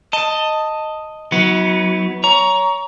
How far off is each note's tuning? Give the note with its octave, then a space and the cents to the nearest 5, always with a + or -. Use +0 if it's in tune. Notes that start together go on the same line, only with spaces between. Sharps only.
D#5 +0 A5 +15
F#3 +0 B3 +0 D#4 +45
C#5 +20 A#5 +15